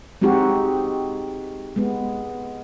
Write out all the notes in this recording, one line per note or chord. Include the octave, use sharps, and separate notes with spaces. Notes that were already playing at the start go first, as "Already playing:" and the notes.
G#3 C4 D#4 F#4 G4
G#3 B3